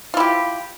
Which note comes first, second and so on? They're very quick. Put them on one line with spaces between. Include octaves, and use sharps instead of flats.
F4 E4 G4